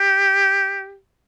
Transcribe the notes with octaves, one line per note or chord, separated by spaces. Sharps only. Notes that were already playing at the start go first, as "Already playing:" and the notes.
Already playing: G4